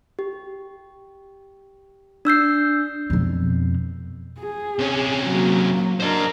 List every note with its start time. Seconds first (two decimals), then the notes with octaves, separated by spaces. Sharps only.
0.19 G4
2.25 D4 E6 G6 C7
3.10 F2 B2
4.40 G#4
4.79 C3 C#4
5.25 F#3 A#3
6.00 D4 A#4 C5 D#5